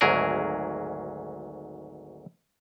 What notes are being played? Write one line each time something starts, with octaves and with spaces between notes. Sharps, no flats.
G#1 D2 G#2 F#3 G#4 A#4